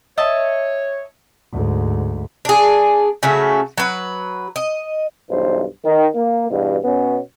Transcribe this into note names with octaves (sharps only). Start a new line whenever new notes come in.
C#5 D#5 E5 A5
D2 G#2
D4 G#4
C#3 F#3 A3
F#3 B4
D#5
B1 G2 E3 C5
D#3
A#3
E2 G2 B2
B2 B3 C#4